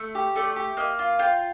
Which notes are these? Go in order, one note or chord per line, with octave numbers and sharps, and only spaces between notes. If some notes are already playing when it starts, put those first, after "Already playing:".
Already playing: A3
G4
A3 D5
G4
A#3 D#5
F4
F4 G5